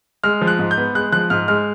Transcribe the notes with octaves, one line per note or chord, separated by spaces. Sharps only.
G#3 F6
F3
F#6
G#2
G6
B3
G#3 F#6
F3 F#6
G#2 F6
G#3 F6